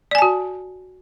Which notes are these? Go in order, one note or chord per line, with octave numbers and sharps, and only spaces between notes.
F#4 D5 G#5 A5